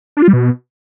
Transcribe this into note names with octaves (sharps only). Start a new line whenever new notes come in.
D4
F4
G3
B2